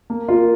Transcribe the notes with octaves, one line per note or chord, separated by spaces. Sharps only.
A#3
F4 A#4